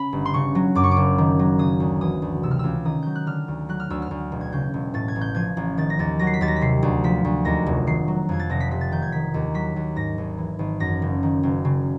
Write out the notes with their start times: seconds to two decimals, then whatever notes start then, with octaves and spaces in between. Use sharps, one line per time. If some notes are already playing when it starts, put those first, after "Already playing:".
Already playing: C#3 B5
0.13 G1
0.25 C6
0.34 C#3 C#6
0.55 F#3
0.75 F#2 D6
0.84 C#6
0.91 D6
0.97 F#1
1.18 D#3
1.39 F#3
1.59 C#3 D#6
1.80 D2
2.01 E3 D#6
2.22 D2
2.43 C3 E6
2.51 F6
2.59 C#2 E6
2.85 D#3 D#6
3.03 F#3 G6
3.15 F#6
3.26 D3 F6
3.48 D2
3.69 F#3 F#6
3.80 F6
3.90 D2 E6
4.02 F6
4.11 D2
4.32 E1
4.41 G#6
4.52 C#3 G6
4.74 E1
4.94 A2 A6
5.08 G#6
5.16 A1
5.21 G6
5.35 F3 G#6
5.57 A1
5.78 D#3 A6
5.90 A#6
5.99 D#2 A6
6.19 F#3 A#6
6.27 C7
6.34 B6
6.41 D#2 A6
6.48 A#6
6.56 B6
6.61 C3 C7
6.83 D2
7.04 F3 B6
7.25 D2
7.45 D#2 A#6
7.66 F1
7.87 D#3 C7
8.08 F#3
8.29 F2 G#6
8.40 A6
8.50 F1 A#6
8.60 B6
8.71 C3 B6
8.81 A6
8.91 D#3 G6
9.02 G#6
9.12 D#3 B6
9.34 D#2
9.54 F#3 B6
9.76 D#2
9.96 G#2 A#6
10.18 G#1
10.38 E3
10.59 G#1
10.80 F#2 A#6
11.02 F#1
11.23 D#3
11.43 F#1
11.65 C#3